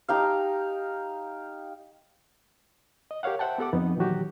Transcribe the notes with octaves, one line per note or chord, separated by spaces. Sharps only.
D#4 G4 F5
D#5
G4 A#4 C#5 F5 F#5
C5 E5 F#5 G5 A5
B3 G4 A4 F#5 D6
F2 B3 D#4
A#2 D#3 E3 F#3 F#4 G4